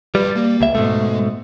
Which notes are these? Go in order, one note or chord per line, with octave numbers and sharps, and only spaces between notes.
G3 B4 D5
A#3
C#2 E5
G#2 B2 G#3 A3